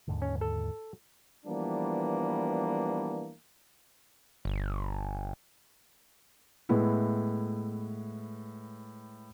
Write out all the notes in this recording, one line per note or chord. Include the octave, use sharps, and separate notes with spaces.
D#2 G#2 D3
C#4
A4
E3 F3 G3 A#3 B3 D4
G1
A2 G#3 B3 E4